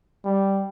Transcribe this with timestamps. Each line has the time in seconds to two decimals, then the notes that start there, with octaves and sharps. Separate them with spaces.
0.25 G3